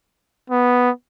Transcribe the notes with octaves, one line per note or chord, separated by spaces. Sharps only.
B3